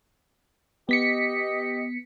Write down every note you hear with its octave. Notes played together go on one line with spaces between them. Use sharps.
B3 G4 D#5 B6 C#7